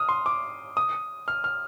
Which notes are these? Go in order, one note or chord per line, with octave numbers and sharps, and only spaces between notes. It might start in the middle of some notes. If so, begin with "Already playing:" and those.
Already playing: D#6 F6
C6
D6
D#6
F6
F6